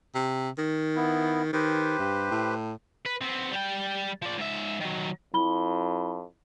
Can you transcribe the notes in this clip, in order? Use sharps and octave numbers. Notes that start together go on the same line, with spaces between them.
C3
D#3
B3 E4
D#3 G4 B4 C5
G2
A2
B4
B3 C4
G3 G5
F3 D5
G#2 E5
D#3 F#3
F2 E4 B5 G7